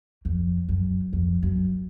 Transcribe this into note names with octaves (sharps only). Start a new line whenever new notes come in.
F2
F#2
F2
F#2